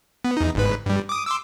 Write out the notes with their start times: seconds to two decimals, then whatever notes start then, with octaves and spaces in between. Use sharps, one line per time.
0.25 B3
0.37 E2 D#4
0.55 G1 G#2 B4
0.86 G2 G3
1.09 D6 D#6
1.26 C6 D6 E6